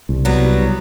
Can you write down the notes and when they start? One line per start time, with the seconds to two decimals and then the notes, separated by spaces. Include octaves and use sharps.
0.09 C2
0.25 F#3 G3 B3